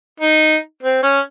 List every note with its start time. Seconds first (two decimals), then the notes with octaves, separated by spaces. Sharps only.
0.20 D#4
0.83 C4
1.03 C#4